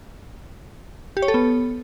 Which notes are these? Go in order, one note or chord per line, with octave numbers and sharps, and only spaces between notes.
G4
C#5
A4
B3